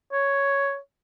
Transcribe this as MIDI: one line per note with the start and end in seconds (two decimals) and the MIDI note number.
0.13 0.77 73